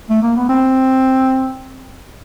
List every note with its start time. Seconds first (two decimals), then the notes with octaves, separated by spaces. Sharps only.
0.10 A3
0.23 A#3
0.37 B3
0.49 C4